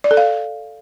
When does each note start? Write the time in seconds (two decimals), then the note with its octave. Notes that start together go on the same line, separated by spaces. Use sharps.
0.04 D5
0.11 A4
0.17 F5